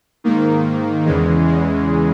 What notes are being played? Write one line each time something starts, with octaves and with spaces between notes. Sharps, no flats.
G#2 D#3 A#3
E2 C#3 E3 G#3
G#3